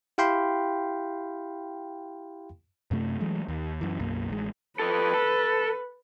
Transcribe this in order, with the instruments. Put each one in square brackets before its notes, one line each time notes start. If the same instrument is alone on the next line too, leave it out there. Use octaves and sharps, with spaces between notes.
[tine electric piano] E4 G4 F5 G5 B5 C6
[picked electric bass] F#2 C3 A3
E3 F#3 G#3 A3
D#2
F#2 E3
B1 F#2 A#3
A1 G#3
[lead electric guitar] F3 A4 [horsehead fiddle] B4
[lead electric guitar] A4